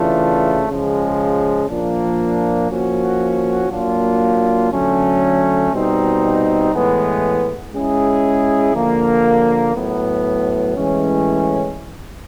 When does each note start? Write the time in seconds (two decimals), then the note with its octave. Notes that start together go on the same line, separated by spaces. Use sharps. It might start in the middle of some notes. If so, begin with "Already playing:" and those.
Already playing: C#3 E3 A3 D4 F4
0.68 C#3 F3 G#3
1.69 A#2 F3 A#3 D4
2.70 F3 A#3 C#4 F#4
3.70 F#3 A#3 D4 F4
4.71 D3 F#3 A3 C#4
5.72 B2 G3 C4 D#4
6.73 A2 E3 G#3 B3
7.73 G#3 C#4 E4 G#4
8.74 D3 F3 A#3
9.75 A2 F#3 B3
10.75 A2 E3 G#3 C#4